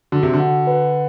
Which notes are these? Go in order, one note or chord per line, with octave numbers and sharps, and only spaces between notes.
D3 F#4
C3
D3
F#5
B4